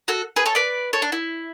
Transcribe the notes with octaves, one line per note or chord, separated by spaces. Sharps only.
F#4 A4
G#4 B4
A4 C#5
B4 D5
A4 C#5
D4
E4